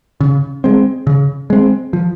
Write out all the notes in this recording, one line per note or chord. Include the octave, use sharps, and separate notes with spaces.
C#3
G#3 C4
C#3
G#3 C4
F3